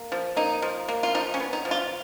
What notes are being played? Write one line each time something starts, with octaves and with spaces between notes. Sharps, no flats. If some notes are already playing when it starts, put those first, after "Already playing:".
Already playing: A#3
F3
A#3 D#4
F3
A#3
F4
F3 D#4
C#4
B3
D#4
F3
F4